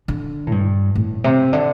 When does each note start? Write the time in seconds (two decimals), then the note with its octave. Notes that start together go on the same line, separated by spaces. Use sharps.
0.08 D3
0.47 A2
0.52 G2
0.95 A2
1.24 C3
1.53 D3